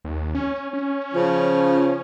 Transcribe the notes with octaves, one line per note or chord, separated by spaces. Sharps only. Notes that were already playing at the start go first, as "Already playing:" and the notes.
D#2
C#4
C#4
C#3 F3